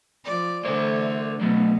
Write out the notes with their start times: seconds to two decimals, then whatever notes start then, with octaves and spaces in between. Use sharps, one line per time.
0.24 F3 D5
0.65 D3 E3 A3 C5 D5
1.41 B2 F#3 A3